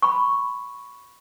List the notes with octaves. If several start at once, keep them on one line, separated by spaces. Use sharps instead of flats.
B5 C#6